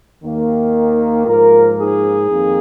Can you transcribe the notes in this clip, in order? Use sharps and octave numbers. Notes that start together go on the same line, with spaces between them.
D#2 D#3 A#3
G#2 F3 A#3 F4 A#4
D#4 G#4
F2 D#3 A#3